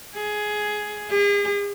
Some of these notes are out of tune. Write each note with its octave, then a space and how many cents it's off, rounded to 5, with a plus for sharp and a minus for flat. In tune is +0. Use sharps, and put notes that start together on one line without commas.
G#4 +10
G#4 -40